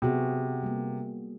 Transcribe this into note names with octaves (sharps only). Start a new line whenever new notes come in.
C3 B3 F#4 G#4
G3 A#3